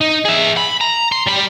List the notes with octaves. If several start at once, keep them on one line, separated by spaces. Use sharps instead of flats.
D#4
G#4 E5
B5
A#5
C6
G3 B5